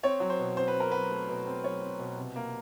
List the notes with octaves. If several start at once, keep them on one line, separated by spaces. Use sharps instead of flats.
C4 C#5
F#3
C5
B2
C4 C5
B4
C4
A#4
F#3 B4
A3
B2
C4
F#3 C#5
C4
B2
C3
A#3